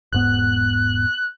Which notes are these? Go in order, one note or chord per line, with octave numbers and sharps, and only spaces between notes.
E1 G#2 B3 F#6